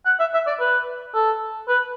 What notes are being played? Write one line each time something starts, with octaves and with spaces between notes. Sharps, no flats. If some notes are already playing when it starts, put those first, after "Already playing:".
F#5
E5
E5
D5
B4
A4
B4